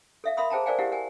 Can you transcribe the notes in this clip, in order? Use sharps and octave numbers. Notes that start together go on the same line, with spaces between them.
A4 E5 F5
A#4 E5 F5 B5 C6 D#6
G#4 C5 G5 A5 A#5
A#4 C5 D5 F5 G5 G#5
E4 G4 A#4 F5 F#5
A#4 F#5 G#5